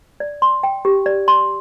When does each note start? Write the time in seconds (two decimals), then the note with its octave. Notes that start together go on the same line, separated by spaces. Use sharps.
0.20 D5
0.42 C6
0.63 G5
0.85 G4
1.06 D5
1.28 C6